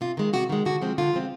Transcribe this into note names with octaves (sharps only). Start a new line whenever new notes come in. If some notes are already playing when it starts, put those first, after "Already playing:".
C3 F4
D#3 G#3
C3 F#4
D#3 G#3
D3 F#4
F3 G#3 C4
D3 F4
F3 G#3 C4